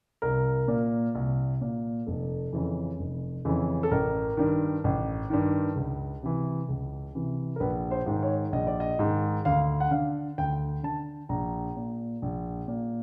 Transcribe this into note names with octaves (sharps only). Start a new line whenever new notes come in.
C2 A#4
A#2
C2
A#2
F1 A4
F2 C#3 E3
F1
F2 C#3 E3
A4
A1 A#4
G2 D#3
A1
G2 D#3
C#2
C3 E3
C#2
C3 E3
A#4
A#1 B4
C5
G#2 D#3
C#5
A#1 D#5
D5
D#5
G#2 D#3
D2 F5
F#5
D3 F5
D2 G5
D3 A5
A#1 A#5
A#2
A#1
A#2